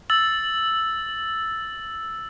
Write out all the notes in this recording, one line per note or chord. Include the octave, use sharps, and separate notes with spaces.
E6 A6 F#7